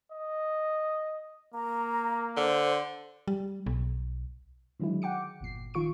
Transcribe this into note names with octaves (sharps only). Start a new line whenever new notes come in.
D#5
A#3 A#5
D3 C5
G3
B1
D3 D#3 F#3 G#3 E4
F#5 G5 D6 C#7
G1 E2 A#2 C7
D#3 F4 C#6 D7